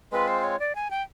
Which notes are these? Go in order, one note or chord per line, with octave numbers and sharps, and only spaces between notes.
G#3 C4 F4 B4
C5
C#5
D5
G#5
G5